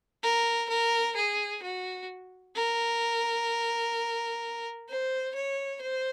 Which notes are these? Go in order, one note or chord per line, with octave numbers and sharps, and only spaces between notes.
A#4
A#4
G#4
F#4
A#4
C5
C#5
C5